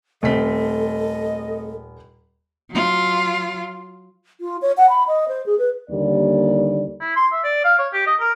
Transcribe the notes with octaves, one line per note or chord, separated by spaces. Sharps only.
D#1 A3 C4 A4 D#5 B6
F#3 F4
F4
C#5
F#5
B5
D#5
C5
G#4
B4
D#2 D3 G3 A#3 D5
E4
C6
E5
D5
F5
C#5
G4
D#5
A#4